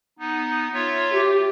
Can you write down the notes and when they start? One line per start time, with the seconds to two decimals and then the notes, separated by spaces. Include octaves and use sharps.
0.19 B3 D#4
0.73 F4 C#5 E5
1.12 G4